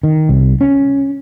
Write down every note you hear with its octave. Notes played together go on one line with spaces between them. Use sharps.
D#3
C2
C#4